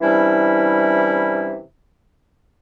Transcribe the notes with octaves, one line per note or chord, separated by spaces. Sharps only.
C3 E3 G3 C#4 D4 E4